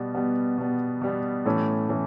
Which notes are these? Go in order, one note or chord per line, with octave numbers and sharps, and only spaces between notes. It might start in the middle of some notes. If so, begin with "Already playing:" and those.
Already playing: B2 G3 B3
B2 G3 B3
B2 G3 B3
B2 G3 B3
A2 E3 A3 C#4
A2 E3 A3 C#4